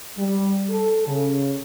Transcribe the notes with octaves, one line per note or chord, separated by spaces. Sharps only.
G3
A4
C#3